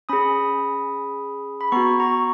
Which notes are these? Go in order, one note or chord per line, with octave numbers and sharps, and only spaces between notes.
C#4 G#4 B5 D#6
B5
B3 F#4 A#5 C#6
A#5 C#6